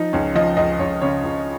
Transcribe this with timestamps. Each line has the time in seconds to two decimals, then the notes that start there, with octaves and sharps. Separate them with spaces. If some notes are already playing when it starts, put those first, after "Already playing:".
Already playing: F3 D#4
0.13 C#2 C#4
0.35 F3 D#5
0.57 C#2 D#5
0.79 C#2 C#5
1.02 C#3 C#5
1.23 C#2